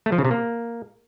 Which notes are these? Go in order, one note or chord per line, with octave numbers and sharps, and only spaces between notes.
A3
F3
C#3
C3
A#3